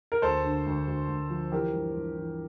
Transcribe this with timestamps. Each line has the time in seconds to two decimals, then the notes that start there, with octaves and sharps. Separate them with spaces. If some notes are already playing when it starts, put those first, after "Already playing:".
0.12 A#4
0.22 D2 A4 C5
0.44 D3
0.66 D2
0.88 D2
1.09 D2
1.30 F3
1.52 E3 G4 A#4
1.74 G2
1.95 G2
2.17 E3